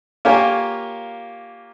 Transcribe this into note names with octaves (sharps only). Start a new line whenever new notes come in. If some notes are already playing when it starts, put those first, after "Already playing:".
A#3 F4 G4 A#4 C#5 G#5